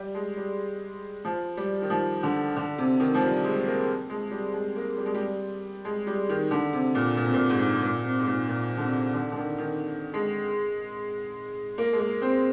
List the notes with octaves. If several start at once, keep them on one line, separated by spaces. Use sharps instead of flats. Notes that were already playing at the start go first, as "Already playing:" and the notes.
Already playing: G3
G#3
G3
F3
G3
D#3
F3
D3
D3
C3
D#3
F3
G3
G#3
A#3
G#3
G3
G#3
A#3
G3
G#3
G3
G#3
G3
D#3
D3
C3
A#2
A#2
C3
A#2
G#2
A#2
C3
G#2
A#2
A#2
D3
C3
D3
D3
D#3
D#3
G#3
A#3
G#3
A#3
C4